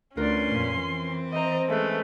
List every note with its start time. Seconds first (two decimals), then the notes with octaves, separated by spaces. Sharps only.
0.17 D2 C#4 F4 A#4 B4 D5 C6
0.52 F2 A#2
0.84 E3 C4
1.32 C5 D#5 E5 A#5
1.69 G#3 A3 C#4 B4